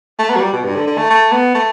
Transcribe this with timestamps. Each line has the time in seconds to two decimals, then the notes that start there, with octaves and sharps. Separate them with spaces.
0.19 A3
0.30 B3
0.36 F#3
0.41 G3
0.53 B2
0.64 G2
0.76 D3
0.87 D3
0.98 A3
1.10 A3
1.32 B3
1.55 A3